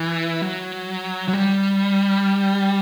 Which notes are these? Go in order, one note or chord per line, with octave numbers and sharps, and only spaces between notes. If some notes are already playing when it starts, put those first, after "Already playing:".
Already playing: E3
F#3
F#3
G3